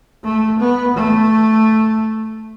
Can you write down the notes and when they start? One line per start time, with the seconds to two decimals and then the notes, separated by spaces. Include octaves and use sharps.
0.24 A3
0.60 B3
0.96 A3